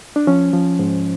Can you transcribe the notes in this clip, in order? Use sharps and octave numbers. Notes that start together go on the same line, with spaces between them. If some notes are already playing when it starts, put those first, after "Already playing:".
D4
F3 C#4
F3
G#2